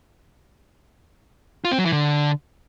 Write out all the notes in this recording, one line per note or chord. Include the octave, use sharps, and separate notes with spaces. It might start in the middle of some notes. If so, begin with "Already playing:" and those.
F4
C4
F#3
E3
D3